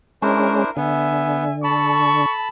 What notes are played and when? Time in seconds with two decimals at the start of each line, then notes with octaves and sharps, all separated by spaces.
0.22 G#3 C#4 D4 E4 A#4 C5
0.77 D3 B3 E5 G#5
1.64 A4 A5 B5 C#6